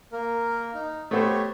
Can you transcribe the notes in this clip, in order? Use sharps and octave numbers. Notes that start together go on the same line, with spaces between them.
A#3 A#4
D#4
A3 B3 G4 C5 C#5